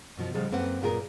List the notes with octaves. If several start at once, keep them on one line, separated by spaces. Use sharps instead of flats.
F#2 B2 F3
A2 C#3 F3 G3 G#3
F#2 A#3 C4 A4 B4 F#5
F#2 A#2 F4 G4 G#4 A#4